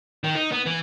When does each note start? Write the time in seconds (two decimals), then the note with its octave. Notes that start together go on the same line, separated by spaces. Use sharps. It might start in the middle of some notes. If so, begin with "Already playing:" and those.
0.24 D#3
0.36 D#4
0.52 B3
0.66 E3